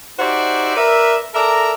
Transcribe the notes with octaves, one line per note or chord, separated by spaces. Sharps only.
D#4 F#4 G4 C5 D5 E5
A#4 B4 D5 E5
A4 A#4 D5 E5 A#5